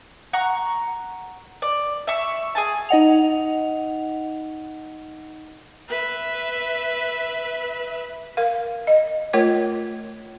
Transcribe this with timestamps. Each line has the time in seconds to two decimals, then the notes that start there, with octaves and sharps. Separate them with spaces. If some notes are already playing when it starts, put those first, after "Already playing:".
0.33 F#5 A#5 C#6
1.62 D5
2.07 E5 C#6
2.55 G#4 G#5 A5
2.89 D#4 D#5 F#5 F7
5.88 B4 E5
8.37 A#4 F5
8.87 D#5
9.33 A3 F4 A#4 C#5